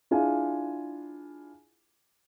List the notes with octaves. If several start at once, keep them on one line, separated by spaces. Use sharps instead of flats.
D4 E4 F4 G#4 F5 G#5